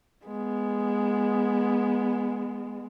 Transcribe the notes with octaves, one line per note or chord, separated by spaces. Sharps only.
G#3 B3